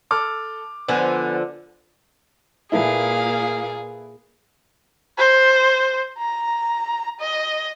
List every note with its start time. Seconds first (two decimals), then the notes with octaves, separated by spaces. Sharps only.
0.11 A4 D6 F6
0.88 D3 F3 B3 G#5
2.72 A#2 A#3 E4 G#4 A4 B4 F5
5.18 C5
6.18 A#5
7.19 D#5